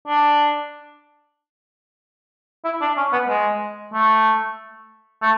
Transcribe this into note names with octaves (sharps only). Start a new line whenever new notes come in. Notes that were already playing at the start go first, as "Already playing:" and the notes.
D4
E4
D4
C#4
B3
G#3
A3
A3